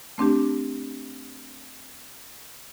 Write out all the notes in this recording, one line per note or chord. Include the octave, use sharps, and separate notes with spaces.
A3 C4 D4 G4